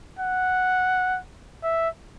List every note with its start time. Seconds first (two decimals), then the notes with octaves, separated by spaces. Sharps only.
0.19 F#5
1.63 E5